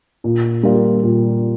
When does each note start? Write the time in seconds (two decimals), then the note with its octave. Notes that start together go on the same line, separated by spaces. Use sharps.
0.24 A#2
0.63 G3 A#3 F4
1.03 A#2